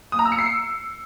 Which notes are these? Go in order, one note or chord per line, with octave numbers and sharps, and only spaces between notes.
D#6
A#5
E6
C#7
C7